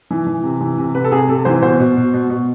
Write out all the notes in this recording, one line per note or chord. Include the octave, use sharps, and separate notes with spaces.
E3
E3
C3
E3
C3
C3 B4
A4
C3 G#4
C3 A4
E3 C5
B2 C5
B2
B2
B2
B2